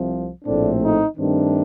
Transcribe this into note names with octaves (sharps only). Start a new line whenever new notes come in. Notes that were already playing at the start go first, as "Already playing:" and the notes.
Already playing: C2 C3 F3
A#1 A2 A3 C4 D4
D#4
G2 D#3 A3 C4 D4